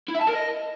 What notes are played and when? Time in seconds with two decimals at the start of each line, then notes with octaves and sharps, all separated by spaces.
0.08 E4
0.15 E5
0.21 A5
0.27 A#4
0.33 D#5